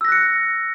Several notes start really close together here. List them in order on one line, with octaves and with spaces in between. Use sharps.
E6 A#6 F#6 C#7